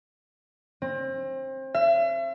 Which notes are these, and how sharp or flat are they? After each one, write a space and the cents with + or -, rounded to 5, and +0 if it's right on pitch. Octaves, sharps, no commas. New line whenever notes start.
C4 +30
E5 +40